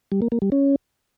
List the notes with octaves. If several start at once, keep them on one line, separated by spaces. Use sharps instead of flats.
G3
A#3
A#3
G3
C#4